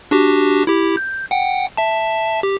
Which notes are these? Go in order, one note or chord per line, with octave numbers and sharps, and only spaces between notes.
D4 F#4 G4
E4 G4
G6
F#5 G5
E5 A5
G4